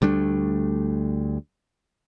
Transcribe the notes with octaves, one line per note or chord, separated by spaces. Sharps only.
D2 G3 A3 D4